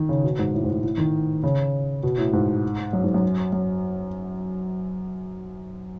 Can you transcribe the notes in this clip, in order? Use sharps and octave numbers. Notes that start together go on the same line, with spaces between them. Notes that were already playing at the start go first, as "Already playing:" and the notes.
Already playing: D#3
C#3
B2
G#2
A2
G#2
A2
A2
D#3
C#3
B2
A2
G#2
F#2
G#2
F#2
F#2